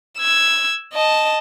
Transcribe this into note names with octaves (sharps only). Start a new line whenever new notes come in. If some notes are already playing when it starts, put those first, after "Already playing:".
E6 G#6
D#5 A5